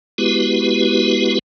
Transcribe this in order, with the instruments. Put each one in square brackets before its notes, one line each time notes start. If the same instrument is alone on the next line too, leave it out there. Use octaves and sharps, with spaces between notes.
[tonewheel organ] G#3 B3 E4 F#4 G4 B4